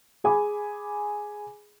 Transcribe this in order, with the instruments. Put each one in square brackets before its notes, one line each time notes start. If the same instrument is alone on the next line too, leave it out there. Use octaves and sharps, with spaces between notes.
[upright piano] G#4 G#5 B5 D6